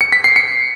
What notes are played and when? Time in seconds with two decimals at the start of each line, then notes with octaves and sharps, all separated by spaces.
0.01 C#7
0.12 B6
0.24 C7
0.36 C#7